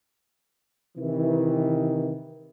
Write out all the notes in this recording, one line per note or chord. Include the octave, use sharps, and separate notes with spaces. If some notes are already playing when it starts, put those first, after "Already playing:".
C3 D#3 E3